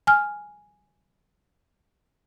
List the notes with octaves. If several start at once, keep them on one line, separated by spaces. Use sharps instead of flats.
G#5 F6